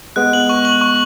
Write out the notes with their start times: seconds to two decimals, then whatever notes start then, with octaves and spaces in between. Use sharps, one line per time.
0.16 G#3 B3 F#6
0.33 F#7
0.49 C#6
0.65 F#7
0.81 C#6